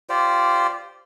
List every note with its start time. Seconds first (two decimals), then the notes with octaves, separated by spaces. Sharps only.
0.09 F4 G4 C5 D5